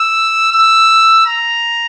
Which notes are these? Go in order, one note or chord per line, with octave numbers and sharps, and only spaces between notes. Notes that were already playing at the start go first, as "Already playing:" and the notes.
Already playing: E6
E6
A#5